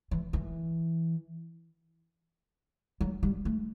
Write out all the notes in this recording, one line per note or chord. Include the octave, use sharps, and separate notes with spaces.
E3
E3
F#3
G3
A3